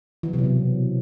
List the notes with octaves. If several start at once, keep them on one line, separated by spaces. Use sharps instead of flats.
E3
F#3
C3
F#3
B2